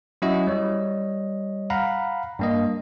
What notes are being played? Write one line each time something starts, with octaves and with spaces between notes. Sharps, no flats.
F#3 C#4 E4 F#4 D#5 E5
G3 C#5 D#5
F5 F#5 A#5 B5
G2 A#3 D#5